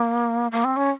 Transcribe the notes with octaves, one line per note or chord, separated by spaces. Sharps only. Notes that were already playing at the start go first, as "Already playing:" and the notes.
Already playing: A#3
A#3
C4
C#4